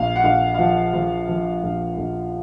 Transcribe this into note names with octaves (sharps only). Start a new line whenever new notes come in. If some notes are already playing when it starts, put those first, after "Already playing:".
Already playing: A#1 F5
F#5
A#1 F5
F5
F3 F#5
F3 F5
F3
A#1
A#1